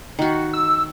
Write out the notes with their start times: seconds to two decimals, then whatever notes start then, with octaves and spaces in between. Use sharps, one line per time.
0.19 D#3 F#4
0.53 E6